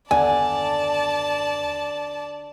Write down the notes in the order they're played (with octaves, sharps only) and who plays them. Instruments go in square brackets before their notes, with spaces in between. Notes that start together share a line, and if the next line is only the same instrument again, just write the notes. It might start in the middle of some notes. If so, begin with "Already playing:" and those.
[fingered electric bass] F#1 D#2 B3 [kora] D3 [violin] D5 A5 [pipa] G#5